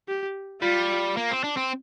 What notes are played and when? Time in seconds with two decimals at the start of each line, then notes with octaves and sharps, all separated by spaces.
0.08 G4
0.62 G3 F4
1.17 A#3
1.31 C4
1.44 D4
1.57 C4